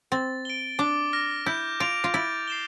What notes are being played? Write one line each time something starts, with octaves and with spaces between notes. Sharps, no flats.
C4 A6
D7 G7
D4 D6
F6 A#6
E4 G6
F4 D7 F7
F4
E4 A6
C7 E7 G7